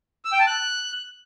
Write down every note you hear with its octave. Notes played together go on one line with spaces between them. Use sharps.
E6
G5
A5
F#6